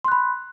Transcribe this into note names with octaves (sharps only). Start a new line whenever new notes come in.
B5 C6 F#6